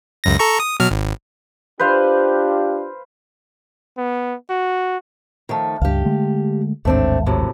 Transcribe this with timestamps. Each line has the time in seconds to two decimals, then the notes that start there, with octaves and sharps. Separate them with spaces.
0.24 C#2 F#2 A#6
0.39 A4 A#5 C#6
0.60 D#6
0.80 B2 F#3 F6
0.91 G#1
1.80 D4 F4 G4 B4 C5 F5
3.97 B3
4.50 F#4
5.49 D#3 F3 A3
5.81 C#2 G2 G4 F5
6.05 D3 G#3 A3
6.85 A1 D#2 G#2 A3 C4 D4
7.26 F#2 A2 C3